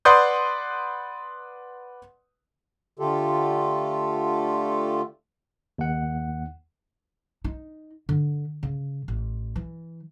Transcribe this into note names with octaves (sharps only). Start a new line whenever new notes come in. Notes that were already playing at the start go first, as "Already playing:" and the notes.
B4 D5 F#5 C6 D#6 G6
D3 A3 F4 G4 A4
D#2 F#5
D#4
D3
C#3
A1
E3